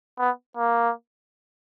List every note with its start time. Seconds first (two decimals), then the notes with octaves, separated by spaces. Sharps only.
0.19 B3
0.57 A#3